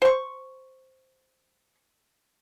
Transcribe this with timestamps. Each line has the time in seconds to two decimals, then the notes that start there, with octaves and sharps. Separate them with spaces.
0.02 C5 C#6